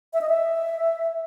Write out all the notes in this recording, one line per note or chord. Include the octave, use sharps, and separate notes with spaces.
E5
D#5
E5